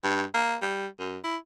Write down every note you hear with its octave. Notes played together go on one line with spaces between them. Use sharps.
G2
A#3
G3
F#2
E4